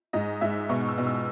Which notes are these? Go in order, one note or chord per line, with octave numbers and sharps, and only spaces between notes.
G#2 D#5
G#2 E5
B2 C#6
E6
B2
E6